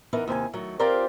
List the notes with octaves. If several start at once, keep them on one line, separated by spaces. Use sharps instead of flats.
E3 B3 D#4 A#4 E5
D#2 C3 B4 G#5
D#3 F#3 A3
C4 F4 G4 A#4 C5 D5